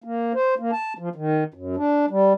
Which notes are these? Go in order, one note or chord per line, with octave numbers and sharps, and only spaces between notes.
A#3
C5
A#3
A5
F3
D#3
F#2
D4
G3